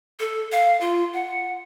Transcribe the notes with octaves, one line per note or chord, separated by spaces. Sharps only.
A4
F5
F4
F#5